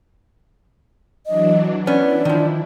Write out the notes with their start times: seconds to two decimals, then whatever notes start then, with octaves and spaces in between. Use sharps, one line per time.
1.26 E3 F#3 D4 D#5
1.87 B3 C#4 D4 E4 D5
2.25 D#3 F3